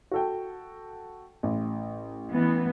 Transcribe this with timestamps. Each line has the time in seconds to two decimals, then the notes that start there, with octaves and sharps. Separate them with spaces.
0.11 F#4 A4 G5
1.43 A1
2.31 E3 B3